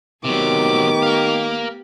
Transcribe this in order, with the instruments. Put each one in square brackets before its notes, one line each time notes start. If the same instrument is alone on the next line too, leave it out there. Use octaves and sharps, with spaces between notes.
[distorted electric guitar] C3 F#3 [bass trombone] D#3 [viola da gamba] A3 B3 G4 [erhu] D6
[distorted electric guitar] A#4 F5